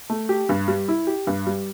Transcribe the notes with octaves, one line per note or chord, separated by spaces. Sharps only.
A3
G4
G2
G3
E4
G4
G2
G3